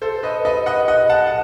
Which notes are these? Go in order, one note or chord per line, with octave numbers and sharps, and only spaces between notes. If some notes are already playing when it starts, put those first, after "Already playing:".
A4 C5
B4 D#5
B4 D#5
D#5 F#5
D#5 F#5
F#5 A5
F#5